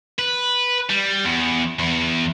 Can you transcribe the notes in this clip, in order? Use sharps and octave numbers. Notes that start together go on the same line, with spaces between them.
B4
G3
E2
E2